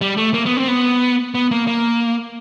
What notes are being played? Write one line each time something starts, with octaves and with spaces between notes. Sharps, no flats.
G3
A3
A#3
B3
C4
B3
B3
A#3
A#3